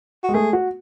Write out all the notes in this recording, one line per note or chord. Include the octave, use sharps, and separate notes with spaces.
F#4
G#3
A3 G#4
F#4